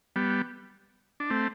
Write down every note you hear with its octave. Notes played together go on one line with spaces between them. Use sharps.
G3 B3
D4
A3 C4